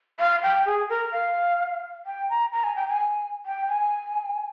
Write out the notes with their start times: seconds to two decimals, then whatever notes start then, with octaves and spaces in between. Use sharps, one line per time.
0.20 F5
0.43 G5
0.66 G#4
0.90 A#4
1.12 F5
2.06 G5
2.30 A#5
2.53 A#5
2.64 G#5
2.76 G5
2.88 G#5
3.46 G5
3.69 G#5